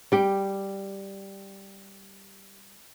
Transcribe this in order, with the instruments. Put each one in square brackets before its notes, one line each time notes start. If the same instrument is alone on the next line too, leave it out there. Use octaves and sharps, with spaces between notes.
[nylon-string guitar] G3 G4